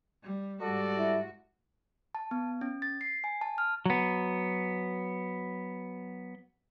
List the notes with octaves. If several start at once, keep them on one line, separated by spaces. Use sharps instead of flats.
G3
G#2 G3 F#4 A4 D5
E4
A5
B3
C#4
A6
C7
G#5
A5
F6
F#3 B3